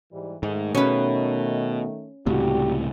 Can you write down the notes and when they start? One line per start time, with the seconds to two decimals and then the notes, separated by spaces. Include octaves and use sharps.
0.12 G#2 E3 G3
0.43 G#2 D#3 A3
0.75 B2 C#4 B4
2.26 C#2 A2 C3 G3 F#4 G4